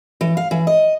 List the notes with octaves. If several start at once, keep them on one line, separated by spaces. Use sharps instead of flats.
E3
F5
E3
D#5